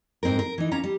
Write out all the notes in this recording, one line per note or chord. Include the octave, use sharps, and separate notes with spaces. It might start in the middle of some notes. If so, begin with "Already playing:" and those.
G#2 C4 D#4 A#4
A#4
E3 D#4
A#3 C#4 A#5
G3